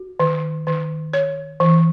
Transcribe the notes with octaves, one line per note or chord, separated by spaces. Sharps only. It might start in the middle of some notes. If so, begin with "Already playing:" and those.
Already playing: F#4
D#3
D#3
C#5
E3